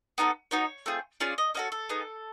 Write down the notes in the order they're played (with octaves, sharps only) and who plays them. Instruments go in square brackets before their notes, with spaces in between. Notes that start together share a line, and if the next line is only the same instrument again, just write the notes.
[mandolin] B3 D#4 F#4 A4
B3 D#4 F#4 C#5
A3 C4 F4 G#4
C#4 F4 G#4 D5
D#5
C#4 F#4 A4 D#5
A4
B3 D#4 G#4